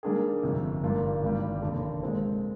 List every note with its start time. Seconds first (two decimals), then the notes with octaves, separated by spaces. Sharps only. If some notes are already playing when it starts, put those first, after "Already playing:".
0.03 D#3 G3 A#3 D4 G#4
0.43 G1 F2 C3
0.83 G1 G2 D#3 A#3 F4
1.23 G#1 G2 D#3 G3 A#3
1.62 F1 D#2 D3
2.02 A#2 G#3 C4